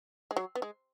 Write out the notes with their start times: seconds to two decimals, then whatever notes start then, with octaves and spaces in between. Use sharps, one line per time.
0.31 G#3
0.36 F#3
0.55 B3
0.62 G#3